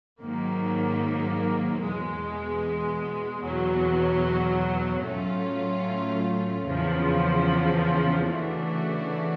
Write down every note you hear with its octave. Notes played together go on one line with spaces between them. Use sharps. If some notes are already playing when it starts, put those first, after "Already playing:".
G#2 D#3 F#3 A#3
E2 B2 G#3
E2 B2 F#3
A2 F#3 A3 C#4 F4
E2 C#3 F3
C#3 E3 A3 D4 F#4